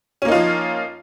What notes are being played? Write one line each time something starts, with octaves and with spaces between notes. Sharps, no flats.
F3 A#3 C#4 D#4 F4